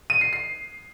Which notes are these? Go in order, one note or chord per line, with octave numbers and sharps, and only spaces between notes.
D#7
C7
C7